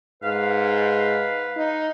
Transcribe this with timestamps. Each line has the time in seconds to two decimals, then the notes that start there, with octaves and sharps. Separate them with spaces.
0.23 G#2 B4 F5
1.56 D#4